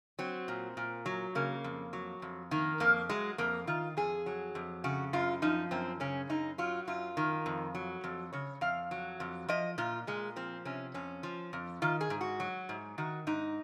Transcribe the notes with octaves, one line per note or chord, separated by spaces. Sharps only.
F#3 C4
A#2
A#2
F#3
C#3 A#3
F2
F#3
F2
D#3 A#3
F2 A#3
F#3 G#3
F2 A#3
D#3 F4
F2 G#4
F#3
F2
C#3 F#4
F#2 F4
F3 D#4
F#2 C4
C#3 C#4
F#2 D#4
F#3 F4
F#2 F4
D#3
F2
F#3
F2
C#3 C#5
F2 F5
F#3
F2
F3 D#5
A#2 F4
A#2 G#3
F3 C4
C3 C#4
F2 C#4
F3
F2
D#3 F4
G#4
G#2
F#4
F#3
G#2
D#3 F#4
G#2 D#4